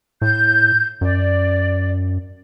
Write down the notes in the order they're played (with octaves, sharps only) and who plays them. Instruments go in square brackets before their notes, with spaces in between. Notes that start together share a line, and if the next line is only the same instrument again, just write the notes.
[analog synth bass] A2 [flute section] G6
[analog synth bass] F#2 [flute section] D5